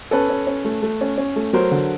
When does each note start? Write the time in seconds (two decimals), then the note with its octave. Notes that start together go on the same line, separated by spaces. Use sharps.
0.11 C#4 A4 B4
0.30 C#4
0.47 C#4
0.65 A3
0.82 A3
1.01 C#4
1.18 C#4
1.36 A3
1.53 F#3 A#4 C5
1.71 D3